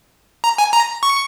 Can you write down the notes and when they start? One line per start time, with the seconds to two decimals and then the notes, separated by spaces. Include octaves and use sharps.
0.44 A#5
0.58 G#5
0.73 A#5
1.03 C#6